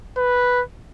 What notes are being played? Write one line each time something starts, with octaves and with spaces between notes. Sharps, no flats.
B4